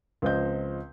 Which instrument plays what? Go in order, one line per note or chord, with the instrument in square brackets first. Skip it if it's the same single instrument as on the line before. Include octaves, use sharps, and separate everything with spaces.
[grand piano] C#2 F3 C4 C5 D#5 G6